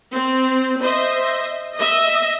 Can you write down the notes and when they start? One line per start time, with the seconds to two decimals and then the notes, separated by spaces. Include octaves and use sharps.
0.12 C4
0.80 C5 D#5 E5
1.76 D#5 E5